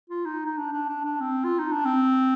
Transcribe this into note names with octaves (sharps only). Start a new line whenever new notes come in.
F4
D#4
D#4
D4
D4
D4
D4
C4
F4
D#4
D4
C4